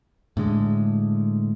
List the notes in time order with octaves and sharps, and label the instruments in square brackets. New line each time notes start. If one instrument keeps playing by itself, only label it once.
[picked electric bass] A2 D3 G#3